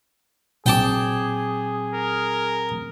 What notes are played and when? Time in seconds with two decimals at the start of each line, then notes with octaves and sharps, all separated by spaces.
0.66 A#2 F#3 C4 G#4 G5 A5 D6
1.95 A#4